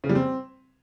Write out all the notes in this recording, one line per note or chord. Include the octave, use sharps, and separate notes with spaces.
C#3
G3
C4